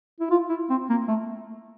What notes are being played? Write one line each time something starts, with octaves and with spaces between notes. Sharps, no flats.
E4
F4
E4
C4
A#3
A3